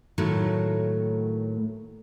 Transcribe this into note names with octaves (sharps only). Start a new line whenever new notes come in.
A2 D#3 F#3 A3 A#3